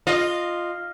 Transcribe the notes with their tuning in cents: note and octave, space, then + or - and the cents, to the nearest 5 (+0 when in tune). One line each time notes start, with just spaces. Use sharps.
F4 +0 D#5 -15